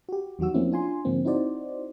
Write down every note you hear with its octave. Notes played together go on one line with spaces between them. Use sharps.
F#4 G4
E2 D#3 F#3 F#4 E6
F3 A3 A#3 C4 C#4 E4
D4 F4 G#5 C6
G#2 D3 F3 A#3 C4
C4 D#4 E4 F#4 C5 D5